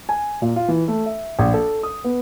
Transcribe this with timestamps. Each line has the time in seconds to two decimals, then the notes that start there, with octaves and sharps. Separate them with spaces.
0.09 G#5
0.42 A#2
0.56 F4
0.68 E3
0.88 A3
1.06 E5
1.39 A#1
1.54 A4
1.83 D#6
2.04 B3